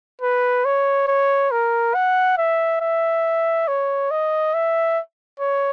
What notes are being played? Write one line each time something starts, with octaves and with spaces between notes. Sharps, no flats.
B4
C#5
C#5
A#4
F#5
E5
E5
C#5
D#5
E5
C#5